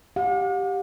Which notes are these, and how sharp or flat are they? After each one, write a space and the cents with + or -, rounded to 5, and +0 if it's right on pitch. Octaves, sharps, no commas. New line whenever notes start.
G4 +0 F#5 -45